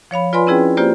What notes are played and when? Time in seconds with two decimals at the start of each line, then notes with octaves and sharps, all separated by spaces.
0.11 F3 C#5 F5 B5
0.33 F4 B4 D5 G#5 B5 C6
0.47 C4 C#4 E4 G#4 B4 G5
0.77 A#3 F4 G4 C5 D5